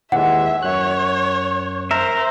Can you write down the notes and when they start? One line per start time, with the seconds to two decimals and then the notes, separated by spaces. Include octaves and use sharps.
0.12 D#2 E3 G#3 E5 F#5
0.63 F#2 C#5 F#6
1.91 A#4 C5 E5